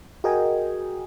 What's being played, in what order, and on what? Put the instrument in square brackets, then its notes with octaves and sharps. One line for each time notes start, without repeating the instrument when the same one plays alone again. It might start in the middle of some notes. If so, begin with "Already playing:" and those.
[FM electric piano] F#4 G#4 A#4 D#5 G5 G#5